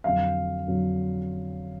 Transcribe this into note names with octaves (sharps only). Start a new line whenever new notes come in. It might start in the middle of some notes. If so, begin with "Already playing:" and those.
F2 D3 F#3 F5
F2 D3 F#3